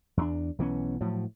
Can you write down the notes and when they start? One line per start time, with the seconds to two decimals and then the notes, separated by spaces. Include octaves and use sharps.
0.17 E2 B3 D4
0.58 B1 E3 B3 C#4
1.01 A2 F3 F#3